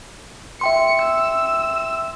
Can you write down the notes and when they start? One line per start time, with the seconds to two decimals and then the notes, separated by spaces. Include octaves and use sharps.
0.61 E5 G5 C6 C#7
1.03 E6